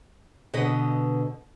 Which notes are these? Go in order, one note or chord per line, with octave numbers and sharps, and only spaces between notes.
B2 D3 B4 D#5